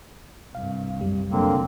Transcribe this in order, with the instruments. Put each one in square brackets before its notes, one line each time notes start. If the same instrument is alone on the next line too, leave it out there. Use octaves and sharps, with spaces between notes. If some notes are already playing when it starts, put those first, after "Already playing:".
[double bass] C2 G2 [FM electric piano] F5
[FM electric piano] F#2 G3
[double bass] F1 F#3 [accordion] D3 A#3 C4